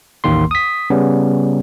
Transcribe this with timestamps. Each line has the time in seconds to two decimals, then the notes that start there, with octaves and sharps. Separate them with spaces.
0.24 A1 D#2 D#3 A#3 C6
0.51 D#6 B6
0.90 C#3 G3 B3 C#4